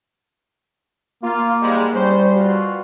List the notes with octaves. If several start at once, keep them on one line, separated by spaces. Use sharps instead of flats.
A#3 F4
G#2 G3 G#3
C2 G3 C#4 C5
B2 F4 F#4